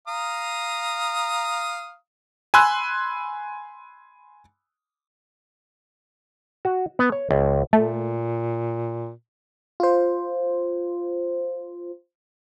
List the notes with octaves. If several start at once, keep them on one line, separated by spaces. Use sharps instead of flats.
F5 A#5 D#6
G#5 B5 C6 E6 F#6
F#4
B3
C#5
C#2
A#2 A3
F4 C5